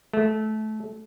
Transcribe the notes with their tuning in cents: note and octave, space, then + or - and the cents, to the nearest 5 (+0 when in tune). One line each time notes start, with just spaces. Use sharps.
A3 -20